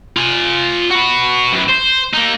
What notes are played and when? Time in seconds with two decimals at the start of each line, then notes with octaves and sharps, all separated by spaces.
0.17 F4 G#5
0.90 F#4 B4
1.53 F#2 B3
1.69 C5
2.13 A#3 D#4